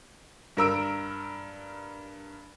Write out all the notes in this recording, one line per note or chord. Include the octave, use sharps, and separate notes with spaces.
G2 A#4 E6 D7